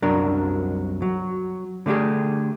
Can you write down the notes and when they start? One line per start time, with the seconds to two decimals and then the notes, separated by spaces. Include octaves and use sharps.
0.02 C2 F#2 F#3 D4 A#4
1.02 F#3
1.86 D3 A3 D4 G4 G#4